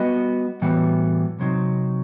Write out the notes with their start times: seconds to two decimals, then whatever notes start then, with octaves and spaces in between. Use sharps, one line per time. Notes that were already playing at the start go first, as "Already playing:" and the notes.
Already playing: G3 B3 F#4 B4 D#5
0.62 A2 E3 G3 B3 F#4
1.40 C3 F#3 C4 D#4